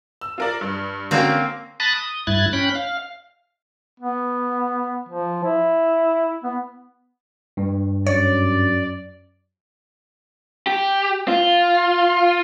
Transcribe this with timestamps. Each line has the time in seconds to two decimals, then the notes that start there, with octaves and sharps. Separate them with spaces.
0.21 E6
0.38 F4 A#4 D5
0.61 G2
1.11 D3 A#3 C4 C#4 F#4
1.80 A5 B5 D#6 F#6 A6 A#6
1.94 D#6
2.27 G2 E4 F#6 G#6 A6
2.53 C#4 G5 B5 F#6
2.75 F5
4.00 B3
5.09 F3
5.43 E4
6.44 B3
7.57 G2
8.07 F#2 C#5 D5
10.67 G4
11.28 F4